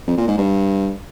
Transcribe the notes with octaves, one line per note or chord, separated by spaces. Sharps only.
F2
A#2
G#2
G2